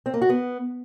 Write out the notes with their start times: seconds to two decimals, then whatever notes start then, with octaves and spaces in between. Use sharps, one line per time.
0.06 C4
0.14 A#3
0.22 F#4
0.29 B3